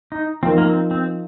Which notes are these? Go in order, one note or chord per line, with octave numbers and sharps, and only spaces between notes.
D#4
F3 C4 D#4 A#4
A#3
C4
C4